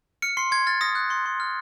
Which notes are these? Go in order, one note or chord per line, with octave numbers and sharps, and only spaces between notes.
F6 C#7
C6 C7
C6 G#6
F6 A6
D#6 A#6
F#6
C6
C6
F6